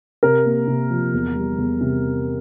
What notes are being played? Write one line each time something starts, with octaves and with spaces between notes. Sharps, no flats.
C3 A#4
A#3
C3
F3
E2
G3
E2
C3